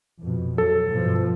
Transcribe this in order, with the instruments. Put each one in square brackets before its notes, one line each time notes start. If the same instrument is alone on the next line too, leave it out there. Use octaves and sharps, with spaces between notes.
[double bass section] F2 B2
[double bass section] F#3 [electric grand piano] A4
[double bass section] G2 B2 F3